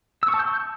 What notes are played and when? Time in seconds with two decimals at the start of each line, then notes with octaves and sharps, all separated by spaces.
0.23 E6
0.28 C#6
0.34 A5
0.39 G6